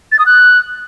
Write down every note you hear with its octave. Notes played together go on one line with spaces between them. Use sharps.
A6
D#6
F#6